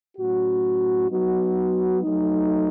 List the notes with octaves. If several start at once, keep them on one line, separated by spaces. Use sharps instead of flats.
A2 F#3 C#4 F#4
F#3 B3 D#4 F#4
F#3 A3 D#4